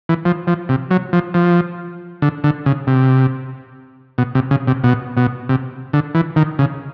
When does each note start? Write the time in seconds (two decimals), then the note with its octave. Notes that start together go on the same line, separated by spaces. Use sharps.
0.09 E3
0.25 F3
0.47 F3
0.69 C3
0.91 F#3
1.13 F3
1.34 F3
2.22 D3
2.44 D3
2.66 C#3
2.87 C3
4.18 B2
4.35 C3
4.51 C#3
4.67 C3
4.84 B2
5.17 B2
5.49 C3
5.93 D3
6.15 E3
6.36 D#3
6.59 C#3